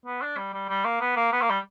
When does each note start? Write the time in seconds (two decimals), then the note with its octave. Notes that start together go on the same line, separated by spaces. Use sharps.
0.06 B3
0.22 D4
0.37 G3
0.54 G3
0.69 G3
0.85 A#3
1.01 B3
1.16 A#3
1.33 B3
1.41 A#3
1.50 G3